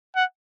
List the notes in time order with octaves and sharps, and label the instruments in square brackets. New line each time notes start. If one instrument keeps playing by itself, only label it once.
[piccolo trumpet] F#5